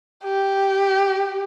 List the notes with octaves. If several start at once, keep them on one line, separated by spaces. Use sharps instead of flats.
G4